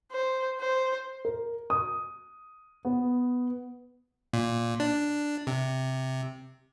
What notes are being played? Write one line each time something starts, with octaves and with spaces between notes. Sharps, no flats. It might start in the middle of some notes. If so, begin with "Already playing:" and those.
C5
C5
A#4
D#6
B3
A#2
D4
C3